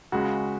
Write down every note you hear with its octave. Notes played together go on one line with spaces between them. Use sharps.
C#2 C#3 G#3 F#4